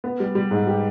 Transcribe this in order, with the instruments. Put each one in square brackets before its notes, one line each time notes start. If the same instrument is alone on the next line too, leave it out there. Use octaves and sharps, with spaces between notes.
[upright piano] B3
G3
G3
G#2
G4